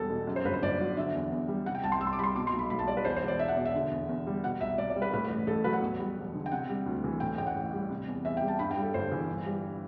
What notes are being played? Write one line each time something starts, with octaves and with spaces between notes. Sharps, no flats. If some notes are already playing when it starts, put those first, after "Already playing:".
Already playing: E1 E2 G3 A4
B2
F#2
C5
G1 B4
C5
G1 D5
F#3
D3 E5
E2
E2
G3
C3 F#5
G5
C2 A5
C6
C2 E6
C6
D6
G3 B5 C6
B2 D6
C6
B1
B5
B1 B5
A5
G3 D5
B4
E2 C5
C5
E1
D5
E1 E5
F#5
B2 D5
E5
D3
E2
E2
G3
B2 F#5
C2 E5
C2 D5
D5
G3
B4
A2 B4
A1
A1 A4
F#3 B4
F#5
E2
G3
E1
D3
G5
C3 F#5
G3
D2
E3
A2 G5
A1 G5
F#5
A1
G3
C3
E2
E2 E5
G5
G3
A5
G2 B5
G5
G3
A4
G1 C5
E3
G2
G3